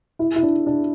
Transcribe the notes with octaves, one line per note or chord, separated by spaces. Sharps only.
E4
E4
D4
D4